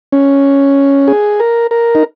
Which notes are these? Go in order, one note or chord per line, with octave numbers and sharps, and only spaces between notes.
C#4
G#4
A#4
A#4
D#4